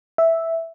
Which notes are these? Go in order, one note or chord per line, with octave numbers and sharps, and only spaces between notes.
E5